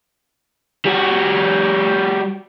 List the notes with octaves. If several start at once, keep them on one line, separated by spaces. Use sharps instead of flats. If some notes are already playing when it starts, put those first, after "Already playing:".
G3 F#4